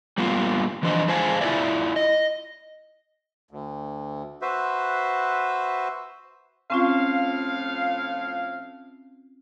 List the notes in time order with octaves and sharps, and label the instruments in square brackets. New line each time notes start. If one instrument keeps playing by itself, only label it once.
[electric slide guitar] G3 A#3 B3 F4
E3 F3 D4 C5 D#5
F3 G#3 C5 F5 G#5 A5
E4 F4 A#4 B4 D5 E5
D#5
[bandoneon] D2
F#4 B4 C5 E5
[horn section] A2 F3 F5 [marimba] C4 C#4 F4